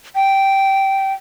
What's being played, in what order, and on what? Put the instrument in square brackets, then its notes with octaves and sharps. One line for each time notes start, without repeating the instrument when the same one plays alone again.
[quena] G5